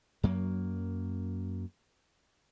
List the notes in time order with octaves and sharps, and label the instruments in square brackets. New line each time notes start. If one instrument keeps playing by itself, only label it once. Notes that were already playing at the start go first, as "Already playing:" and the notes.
[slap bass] F#2 F#3 A#3